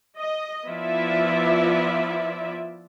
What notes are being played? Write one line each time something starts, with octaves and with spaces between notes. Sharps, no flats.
D#5
F3 B3 E4 F4 D5 E5